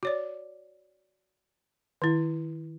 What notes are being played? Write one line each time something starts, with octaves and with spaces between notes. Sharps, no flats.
F#4 C#5 D5
D#3 E4